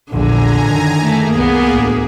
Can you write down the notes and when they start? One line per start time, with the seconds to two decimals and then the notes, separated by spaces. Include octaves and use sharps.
0.11 A#1 E2 A#2 D3 G#5 A#5
0.67 F#2 D#3 E3
1.02 A3 A#3 G#4
1.35 C2 B3
1.70 A1 D2